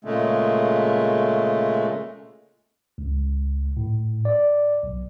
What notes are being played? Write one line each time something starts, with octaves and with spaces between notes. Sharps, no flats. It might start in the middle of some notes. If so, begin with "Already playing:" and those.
A#2 C#3 G#3 A3
C#2
A2
D5
B1